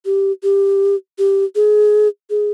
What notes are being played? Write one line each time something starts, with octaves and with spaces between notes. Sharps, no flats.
G4
G4
G4
G#4
G#4